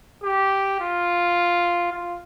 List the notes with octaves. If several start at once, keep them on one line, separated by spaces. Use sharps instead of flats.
G4
F4
F4